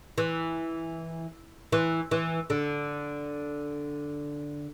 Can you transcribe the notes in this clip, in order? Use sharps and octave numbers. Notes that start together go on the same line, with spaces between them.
E3
E3
E3
D3